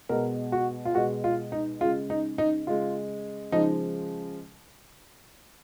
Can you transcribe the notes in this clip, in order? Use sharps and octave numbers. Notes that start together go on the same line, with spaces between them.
B2 G#3 A#4
F#4
F4
B2 G#3 F#4
F4
D#4
C#3 G#3 F4
D#4
D#4
C#3 G#3 F4
C#3 F3 G#3 D#4